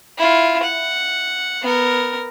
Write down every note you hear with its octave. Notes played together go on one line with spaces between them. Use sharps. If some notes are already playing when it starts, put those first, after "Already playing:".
E4 F4
F#5
B3 A#4